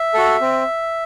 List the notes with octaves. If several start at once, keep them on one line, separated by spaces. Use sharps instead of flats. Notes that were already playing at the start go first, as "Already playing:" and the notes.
Already playing: E5
F#4 A4
C4